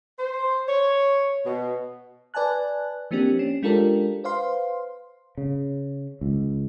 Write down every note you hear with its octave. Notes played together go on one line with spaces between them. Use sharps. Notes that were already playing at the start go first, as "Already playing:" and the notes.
C5
C#5
B2
B4 D5 G#5 A5 F#6
F3 A#3 C4 D4 G4
C#4
G#3 D4 F4 G4 A4 A#4
B4 C5 F5 C6
C#3
C#2